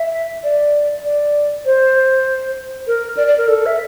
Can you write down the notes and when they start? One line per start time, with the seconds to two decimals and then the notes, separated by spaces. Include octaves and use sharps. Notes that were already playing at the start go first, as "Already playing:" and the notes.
Already playing: E5
0.44 D5
1.04 D5
1.65 C5
2.87 A#4
3.17 D5
3.27 D5
3.38 A#4
3.48 A4
3.66 E5